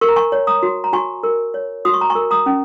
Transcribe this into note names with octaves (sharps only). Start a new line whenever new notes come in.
A#4 C#6
A#5
G#5 C#6
C#5
A#5 D#6
F#4
A#5
F#4 G#5 C#6
A#4
C#5
F#4 D#6
C#6
A#5
G#5 C#6
A#4
A#5 D#6
C#4